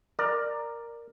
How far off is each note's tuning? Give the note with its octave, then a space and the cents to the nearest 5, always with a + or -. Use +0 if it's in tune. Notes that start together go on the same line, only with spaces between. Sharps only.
A#4 +0 D5 +15